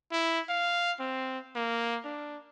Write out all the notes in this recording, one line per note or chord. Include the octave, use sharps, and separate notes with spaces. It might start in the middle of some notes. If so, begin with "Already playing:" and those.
E4
F5
C4
A#3
D4